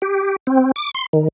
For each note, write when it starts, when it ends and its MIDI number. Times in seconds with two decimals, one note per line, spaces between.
0.02 0.36 67
0.47 0.71 60
0.76 0.91 86
0.95 1.06 84
1.13 1.28 51